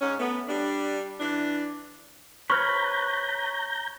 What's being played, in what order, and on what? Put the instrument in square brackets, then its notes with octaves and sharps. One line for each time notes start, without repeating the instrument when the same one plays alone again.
[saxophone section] G#2 C#4
A3 B3
G3 D4
E3 D4
[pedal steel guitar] B4 [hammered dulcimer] C#5 [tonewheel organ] A#5 G6 [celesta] C#6 F6